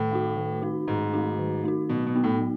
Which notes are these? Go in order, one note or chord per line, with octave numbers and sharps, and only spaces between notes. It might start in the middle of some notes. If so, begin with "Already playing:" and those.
Already playing: A2 D#3
A3 D#4 F#4
D#3
A3 D#4 F#4
G#2 D#3
A3 D#4 F#4
D#3
A3 D#4 F#4
B2 F#3
B2
B3 D#4 F#4
A2
F#3